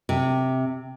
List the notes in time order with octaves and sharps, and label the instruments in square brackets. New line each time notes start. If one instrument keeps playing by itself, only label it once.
[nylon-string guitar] C3